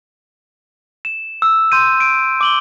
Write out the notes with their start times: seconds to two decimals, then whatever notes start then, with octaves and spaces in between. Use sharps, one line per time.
1.05 E7
1.42 E6
1.72 C6 G6 D#7
2.00 D7
2.41 D6 F#7 G7